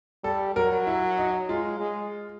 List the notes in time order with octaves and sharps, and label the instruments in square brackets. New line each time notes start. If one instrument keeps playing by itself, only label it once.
[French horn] G3 [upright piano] A4
[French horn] F#3 [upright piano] A#4
[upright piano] E4
D#4
[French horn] G#3 [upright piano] F4
[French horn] G#3